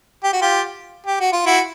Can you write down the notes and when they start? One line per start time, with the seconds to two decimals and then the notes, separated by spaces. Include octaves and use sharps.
0.23 G4
0.33 F#4
0.42 F4 G4
1.06 G4
1.20 F#4
1.33 F4
1.46 E4 F#4